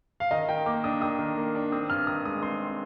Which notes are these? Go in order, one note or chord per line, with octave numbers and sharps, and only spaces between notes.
F5
D#3 D#5
D#3 G5
A#3 D6
D4 D#6
D#3 D#6
D#3
A#3
D4
C4 D#6
G2 F6
D#3 D#6
G#3 D#6
C4 C6